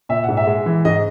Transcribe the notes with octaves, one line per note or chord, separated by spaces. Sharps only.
A#2 E5
G#2 F#5
E5
G#3
E3
G#2 D#5